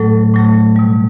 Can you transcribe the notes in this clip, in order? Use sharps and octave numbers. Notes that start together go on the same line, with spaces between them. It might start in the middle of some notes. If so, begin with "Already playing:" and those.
Already playing: A2 F#3 A3 A4
A2 F#3 A3
B2 G3